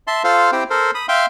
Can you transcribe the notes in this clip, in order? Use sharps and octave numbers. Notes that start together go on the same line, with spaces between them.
E5 A5 C6
F4 A4 C5 F5
C4 E4 G4 C5 G5
A4 A#4 C5
B5 D#6
E5 F5 G5 C6